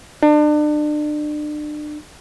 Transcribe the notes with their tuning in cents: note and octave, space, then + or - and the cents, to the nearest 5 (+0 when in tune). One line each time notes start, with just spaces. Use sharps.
D4 +35